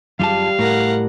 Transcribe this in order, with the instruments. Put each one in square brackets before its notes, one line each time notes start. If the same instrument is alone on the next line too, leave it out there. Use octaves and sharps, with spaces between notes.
[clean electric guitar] F#2 F4 A5 [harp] G3 [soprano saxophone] F5
[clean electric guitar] A2 [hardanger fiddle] A#4 F#5